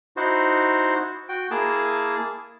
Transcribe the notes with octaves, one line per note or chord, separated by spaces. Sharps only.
D#4 E4 F#4 C5
F#4 G5
A#3 E4 G#4 A5